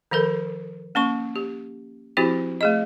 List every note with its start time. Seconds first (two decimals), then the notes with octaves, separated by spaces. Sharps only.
0.11 D#3 F3 A4 A#4
0.95 A#3 C#4 C#6
1.36 G4
2.17 F3 C4 E4 F#4 G4
2.61 A3 G#4 D#5